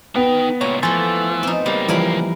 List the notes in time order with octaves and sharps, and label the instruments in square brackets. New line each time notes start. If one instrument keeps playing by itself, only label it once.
[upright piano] B3 [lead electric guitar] D#4 G5
[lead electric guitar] C#2 A#2 [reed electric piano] C#5 [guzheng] A#5
[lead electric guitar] E3 [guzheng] F3 A3 [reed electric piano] G#5 C6 A6
[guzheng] C4 D#4
[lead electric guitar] C#2 A#3 [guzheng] G3
[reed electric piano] E3 F3 G3 [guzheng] A#4 G#5 B5